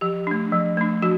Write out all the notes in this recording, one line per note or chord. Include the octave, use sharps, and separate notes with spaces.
F3 G4
A3 D4
F3
A3 D4
F3 F#4